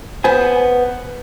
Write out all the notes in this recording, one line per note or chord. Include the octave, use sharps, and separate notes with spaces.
B3 C5 G#5